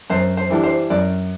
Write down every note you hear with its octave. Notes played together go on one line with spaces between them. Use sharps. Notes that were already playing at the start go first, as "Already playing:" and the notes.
F#2 C5
C5
E3 G3 D4
C5
F#2 D5